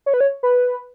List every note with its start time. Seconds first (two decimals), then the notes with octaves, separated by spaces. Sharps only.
0.06 C#5
0.14 B4
0.21 C#5
0.43 B4